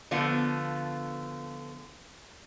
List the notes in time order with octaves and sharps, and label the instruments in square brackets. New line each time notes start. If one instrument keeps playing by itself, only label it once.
[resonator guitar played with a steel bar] D3 F3 A3 B3 F4 F#5